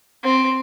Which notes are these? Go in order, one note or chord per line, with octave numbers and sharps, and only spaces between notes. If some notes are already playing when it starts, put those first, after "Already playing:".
C4